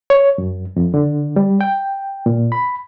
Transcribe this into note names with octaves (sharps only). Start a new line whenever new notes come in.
C#5
F#2
F2
D3
G3
G5
A#2
B5